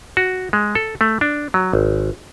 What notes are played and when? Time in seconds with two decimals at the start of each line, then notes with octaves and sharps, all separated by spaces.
0.17 F#4
0.53 G#3
0.75 A4
1.01 A3
1.21 D4
1.54 F#3
1.73 G#1